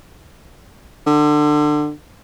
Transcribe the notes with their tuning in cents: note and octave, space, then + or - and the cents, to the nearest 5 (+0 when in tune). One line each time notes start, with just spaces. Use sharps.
D3 +25